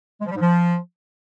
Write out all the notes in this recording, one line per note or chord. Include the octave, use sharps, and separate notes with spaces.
G#3
F3
G3
G#2
F3